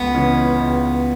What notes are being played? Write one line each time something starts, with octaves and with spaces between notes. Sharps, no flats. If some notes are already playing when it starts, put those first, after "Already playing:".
Already playing: C#2 B3
C#3 E3 G#3 C#4
C#2